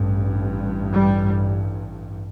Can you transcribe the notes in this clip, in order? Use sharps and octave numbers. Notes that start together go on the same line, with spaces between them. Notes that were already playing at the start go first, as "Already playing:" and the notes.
Already playing: A1 G2
G3